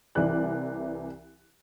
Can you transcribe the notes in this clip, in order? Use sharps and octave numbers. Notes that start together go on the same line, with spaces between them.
C2 E3 D5 F#6